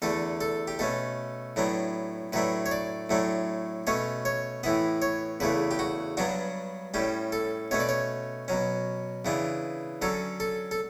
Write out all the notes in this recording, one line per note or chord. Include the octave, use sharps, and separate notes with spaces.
E2 D3 A3 A4
A4
G4
B2 A3 C#4 A4
A2 F#3 B3 D4
A2 F#3 A3 D4 B4
C#5
D5
A2 F#3 A3 D4
B2 A3 C#4 C#5
C#5
A2 E3 B3 B4
C#5
E2 C#3 E3 A3 B4
G4
F#4
G2 F#3 B3 D4 F#4
A2 G3 C#4 G4
A4
B2 A3 C#4 C#5
D5
C#5
B2 F#3 C#4
C#3 E3 B3 D4
D3 F#3 C#4 A4
A4
A4